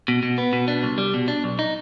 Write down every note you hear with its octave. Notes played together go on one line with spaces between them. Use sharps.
B2
B2
B3
B2
D4
C2
G3
B2
D4
B1
D#4